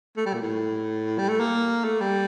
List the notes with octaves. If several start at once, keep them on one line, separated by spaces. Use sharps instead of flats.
A3
G3
A#2
A2
G3
A3
A#3
A3
G3